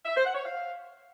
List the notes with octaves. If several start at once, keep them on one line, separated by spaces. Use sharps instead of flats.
E5
C5
F#5
C#5
F5